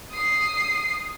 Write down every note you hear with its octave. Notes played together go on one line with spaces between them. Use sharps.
D#6 C7